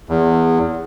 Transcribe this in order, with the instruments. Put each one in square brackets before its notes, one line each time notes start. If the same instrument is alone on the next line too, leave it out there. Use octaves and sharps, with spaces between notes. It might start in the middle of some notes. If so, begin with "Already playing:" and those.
[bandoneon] E2